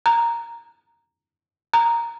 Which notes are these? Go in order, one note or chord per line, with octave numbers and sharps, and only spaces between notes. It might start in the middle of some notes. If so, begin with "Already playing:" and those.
A#5
A#5